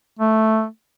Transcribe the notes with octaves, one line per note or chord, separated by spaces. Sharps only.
A3